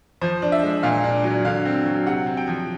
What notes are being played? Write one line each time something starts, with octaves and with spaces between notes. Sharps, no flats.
F3 C5
D4
E5
G#3
A#2 F5
D4
F#3
D3 F5
C4
F#3
C3 F#5
C4
G5
F3